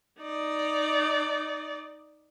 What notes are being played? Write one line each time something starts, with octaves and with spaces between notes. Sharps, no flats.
D#4 D5